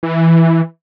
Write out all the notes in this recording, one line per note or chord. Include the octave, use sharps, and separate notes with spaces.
E3